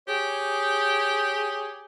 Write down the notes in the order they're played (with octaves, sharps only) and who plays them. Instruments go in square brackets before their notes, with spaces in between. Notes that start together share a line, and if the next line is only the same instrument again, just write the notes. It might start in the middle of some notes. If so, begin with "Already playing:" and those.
[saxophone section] G4 G#4 C#5